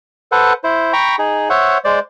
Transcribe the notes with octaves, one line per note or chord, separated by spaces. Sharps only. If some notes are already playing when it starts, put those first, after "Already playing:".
A4 B4 C5 F#5
E4 C5
G5 A#5 B5 C#6
D#4 G#4
C5 C#5 E5 F#5
G#3 C5 D5